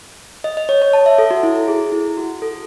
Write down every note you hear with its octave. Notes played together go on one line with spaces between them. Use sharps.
D#5
D#5
C#5
C#5
A5
E5
A4
F#4
E4
G#4
E4
F#4
A4